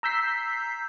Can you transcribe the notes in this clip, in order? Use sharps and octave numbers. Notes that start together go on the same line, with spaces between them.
A#5 E6 G6 B6 C7